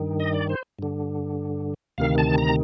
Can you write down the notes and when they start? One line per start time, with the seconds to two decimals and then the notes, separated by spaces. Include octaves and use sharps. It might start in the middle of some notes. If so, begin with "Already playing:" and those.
Already playing: G2 D#3
0.20 D#5
0.34 D5
0.49 C5
0.79 G2 D3
1.98 D2 C3 D#3 F5
2.18 A5
2.38 A#5